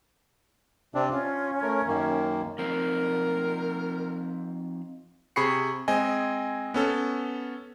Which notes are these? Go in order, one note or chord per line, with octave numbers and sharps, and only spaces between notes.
C3 C4 D4
C#4 F4
A3 A#4
F#2 D#3 A#3
F3 C4 D#4 A#4
C3 G#4 B5 C#6 C7 C#7
G#3 C4 D#5 G#5
B3 C#4 A4